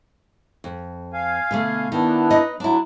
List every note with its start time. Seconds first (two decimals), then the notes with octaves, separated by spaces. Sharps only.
0.64 F2
1.13 F5 G#5
1.51 B2 D3 A3
1.92 D#3 B3 D4 E4
2.30 D#4 B4 D#5
2.60 F#3 D4 E4